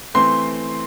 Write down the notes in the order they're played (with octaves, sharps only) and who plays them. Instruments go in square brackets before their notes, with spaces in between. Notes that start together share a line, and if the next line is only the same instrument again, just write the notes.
[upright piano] E3 A3 C4 C6